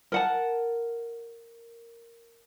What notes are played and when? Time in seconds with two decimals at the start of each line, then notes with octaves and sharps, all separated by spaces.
0.12 A#4 F#5 A5